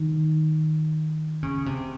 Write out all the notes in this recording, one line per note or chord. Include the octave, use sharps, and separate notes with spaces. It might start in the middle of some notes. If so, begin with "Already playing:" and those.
Already playing: D#3
C#3
C3